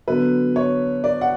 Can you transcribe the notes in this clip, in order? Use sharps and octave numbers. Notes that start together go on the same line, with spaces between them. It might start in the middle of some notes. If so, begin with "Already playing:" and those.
D3 F#3 B3 B4
C#5
D5
F#5